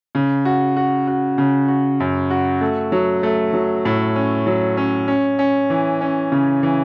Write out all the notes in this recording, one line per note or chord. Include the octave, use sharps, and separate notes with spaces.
C#3
F#4
F#4
F#4
C#3
F#4
F#2
F#4
A3
F#3
A3
F#3
A2
C#4
F#3
C#4
C#4
C#4
E3
C#4
C#3
E3